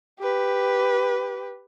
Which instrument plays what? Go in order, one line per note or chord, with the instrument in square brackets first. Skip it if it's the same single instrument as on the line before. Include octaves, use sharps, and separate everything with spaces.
[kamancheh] G4 B4